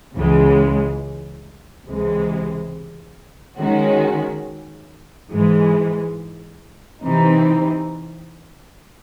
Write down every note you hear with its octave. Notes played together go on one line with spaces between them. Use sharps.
C#2 C#3 E3 G#3
C#2 C3 E3 G#3
D#3 G#3 C#4 F#4
G#2 E3 G#3
C3 E3 C4 D#4